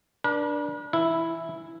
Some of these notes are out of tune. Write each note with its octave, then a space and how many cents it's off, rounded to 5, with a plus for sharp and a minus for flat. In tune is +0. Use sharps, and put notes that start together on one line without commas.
D4 +0 B4 -45
E3 +0 E4 +0 E5 +0